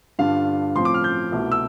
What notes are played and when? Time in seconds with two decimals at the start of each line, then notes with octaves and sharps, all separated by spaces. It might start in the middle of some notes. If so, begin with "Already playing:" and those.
0.19 G2 D3 G3 D4 F4 F5
0.76 A2 F3 C4 F4 C6
0.85 D6
0.94 F6
1.04 G6
1.32 C2 B2 A3 E4
1.52 E6